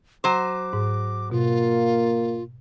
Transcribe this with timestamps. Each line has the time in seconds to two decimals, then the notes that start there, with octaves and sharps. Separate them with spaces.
0.24 F#3 C5 D6
0.73 G#2
1.32 B2 A#3 F4